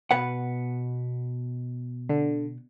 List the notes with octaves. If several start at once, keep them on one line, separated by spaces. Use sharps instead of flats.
B2 B4 F#5
D3